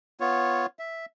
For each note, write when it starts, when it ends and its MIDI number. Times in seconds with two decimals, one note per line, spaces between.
0.20 0.66 59
0.20 0.66 65
0.20 0.66 73
0.79 1.06 76